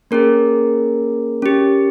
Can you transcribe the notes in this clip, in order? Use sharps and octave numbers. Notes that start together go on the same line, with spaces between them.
A#3 C#4 G#4 A#4
C#4 G4